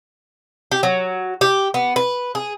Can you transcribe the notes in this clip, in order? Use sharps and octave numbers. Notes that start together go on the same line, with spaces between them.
G4
F#3
G4
B3
B4
G#4